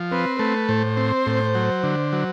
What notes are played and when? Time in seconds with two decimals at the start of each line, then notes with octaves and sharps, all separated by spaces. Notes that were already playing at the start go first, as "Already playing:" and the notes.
Already playing: F3
0.12 C4 B4
0.39 A3 B4
0.69 A2 C5
0.97 C4
1.26 A2
1.55 F#3
1.83 D3
2.13 F#3